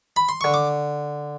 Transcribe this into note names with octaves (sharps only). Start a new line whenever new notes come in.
B5
C6
D3 C#6
D6